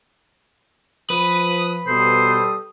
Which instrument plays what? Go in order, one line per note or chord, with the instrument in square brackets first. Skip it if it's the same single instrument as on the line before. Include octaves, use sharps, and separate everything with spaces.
[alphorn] F3 [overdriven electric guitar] B4 [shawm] D#6
[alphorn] B2 [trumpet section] G3 A4 D#6 [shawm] C5